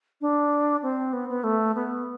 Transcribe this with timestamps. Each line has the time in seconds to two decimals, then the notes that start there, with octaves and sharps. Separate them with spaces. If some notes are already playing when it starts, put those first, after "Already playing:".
0.21 D4
0.82 C4
1.13 B3
1.29 B3
1.44 A3
1.75 B3